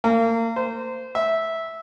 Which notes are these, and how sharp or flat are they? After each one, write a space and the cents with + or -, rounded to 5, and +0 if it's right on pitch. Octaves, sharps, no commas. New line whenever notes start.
A#3 -30
C5 -20
E5 -10